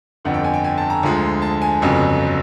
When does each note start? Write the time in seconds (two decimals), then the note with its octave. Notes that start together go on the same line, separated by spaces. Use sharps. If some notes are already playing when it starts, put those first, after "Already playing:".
0.25 G1 F2 D3 F#5
0.34 G5
0.44 G#5
0.54 G5
0.64 G#5
0.77 A5
0.90 A#5
1.03 D2 D3 F3 G#3
1.42 A5
1.62 G#5
1.82 G1 F2 C#3 F#3